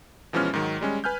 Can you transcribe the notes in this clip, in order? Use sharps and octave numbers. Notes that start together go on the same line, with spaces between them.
B2 E3 F3 G#3 C#4 F6
G#2 D#3 F#3
G3 G#3 C#4
B4 G#5 F6 G6